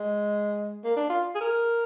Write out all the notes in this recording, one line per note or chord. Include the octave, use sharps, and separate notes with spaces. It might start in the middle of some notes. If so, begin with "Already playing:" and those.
Already playing: G#3
A#3
D4
F4
G#4
A#4